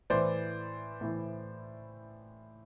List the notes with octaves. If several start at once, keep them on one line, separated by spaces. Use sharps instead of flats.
A2 E3 C5 D5
A2 E3